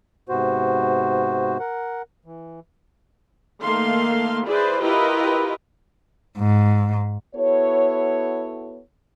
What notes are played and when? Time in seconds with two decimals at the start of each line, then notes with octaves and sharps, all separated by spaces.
0.29 G#2 C3 B3 F#4 C5
1.59 A#4 F#5
2.25 E3
3.61 D#3 A3 A#3 A4 F5 C6
4.48 E4 G#4 B4 C5 D5
4.82 E4 F4 G4 A#4 B4 D#5
6.39 G#2
7.34 B3 E4 F#4 A4 C#5